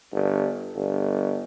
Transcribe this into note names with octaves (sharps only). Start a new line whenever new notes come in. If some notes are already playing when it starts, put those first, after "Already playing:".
G1
G1